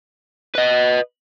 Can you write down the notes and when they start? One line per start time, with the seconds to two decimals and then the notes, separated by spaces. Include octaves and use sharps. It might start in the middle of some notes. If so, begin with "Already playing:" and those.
0.55 B4 D#5